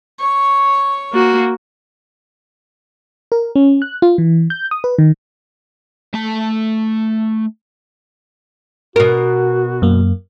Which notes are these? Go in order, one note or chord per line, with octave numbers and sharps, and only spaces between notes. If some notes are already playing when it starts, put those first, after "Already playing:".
C#5 C#6
A#3 F#4
A#4
C#4
F#6
F4
E3
G6
D#6
B4
D#3
A3 A5
B2 F#4 A#4
F#2 A#3